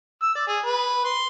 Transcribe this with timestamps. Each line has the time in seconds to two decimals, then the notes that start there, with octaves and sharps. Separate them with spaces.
0.23 E6
0.35 D5
0.48 G#4
0.66 B4
1.05 C6